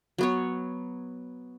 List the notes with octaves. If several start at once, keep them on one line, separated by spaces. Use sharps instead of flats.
F#3 B3 C#5